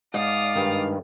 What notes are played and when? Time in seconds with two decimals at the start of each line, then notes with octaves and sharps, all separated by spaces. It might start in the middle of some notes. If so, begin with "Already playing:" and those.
0.14 G#2 D5 F5 D#6
0.56 G2 D#3